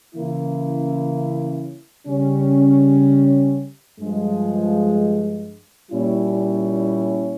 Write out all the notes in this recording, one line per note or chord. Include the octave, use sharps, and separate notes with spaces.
C#3 E3 A#3 C#4 E4
C#3 G3 C#4
G2 F3 G#3
A#2 G3 C#4 E4